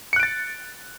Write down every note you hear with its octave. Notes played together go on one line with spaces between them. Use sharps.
F#6 A6 C#7 D7